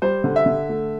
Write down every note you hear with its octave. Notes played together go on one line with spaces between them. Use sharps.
G3 C5
D3
E5
D3
A3